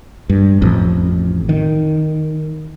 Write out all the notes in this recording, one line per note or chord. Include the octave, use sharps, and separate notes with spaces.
G2
A1 F2
D#3